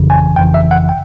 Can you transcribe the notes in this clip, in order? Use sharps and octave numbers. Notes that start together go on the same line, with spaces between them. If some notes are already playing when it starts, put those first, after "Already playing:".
Already playing: G1 F2 C#3 E3
G#5
G1 F2 C#3 E3 G5
E5
F#5
G5